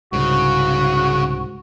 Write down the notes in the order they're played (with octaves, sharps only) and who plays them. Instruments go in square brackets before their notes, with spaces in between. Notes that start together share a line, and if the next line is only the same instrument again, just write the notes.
[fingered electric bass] C2 G#2 [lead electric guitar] C#3 [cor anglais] F#4